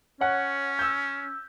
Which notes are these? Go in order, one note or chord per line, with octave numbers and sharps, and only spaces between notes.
C#4 C#5 F#5 F#6
E6 G6